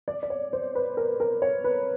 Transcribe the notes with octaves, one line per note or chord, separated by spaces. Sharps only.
D5
D5
C#5
C5
B4
A#4
A#4
C#5
B4